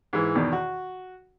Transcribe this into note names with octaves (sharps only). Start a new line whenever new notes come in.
G#2 E3
E2 B2 D#3
F#4